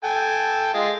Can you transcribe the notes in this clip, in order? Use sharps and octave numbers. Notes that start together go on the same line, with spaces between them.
A4 G5 G#5
G#3 F4